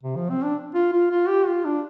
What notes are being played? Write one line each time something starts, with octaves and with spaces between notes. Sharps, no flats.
C3
F3
C4
D4
F4
F4
F4
G4
F4
D4